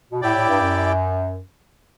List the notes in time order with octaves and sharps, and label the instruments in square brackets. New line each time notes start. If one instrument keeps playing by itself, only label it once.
[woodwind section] B2
[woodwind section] A2 [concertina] E4 G4 D5 G5
[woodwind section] A2
G2
F#2